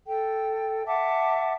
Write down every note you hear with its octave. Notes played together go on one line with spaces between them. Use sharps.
A4 G5
E5 F#5 A5 D6